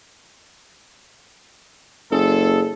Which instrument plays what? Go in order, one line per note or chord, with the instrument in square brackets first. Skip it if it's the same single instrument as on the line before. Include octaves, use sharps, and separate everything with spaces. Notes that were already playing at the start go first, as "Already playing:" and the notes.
[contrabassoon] F#1 [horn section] G#4 A4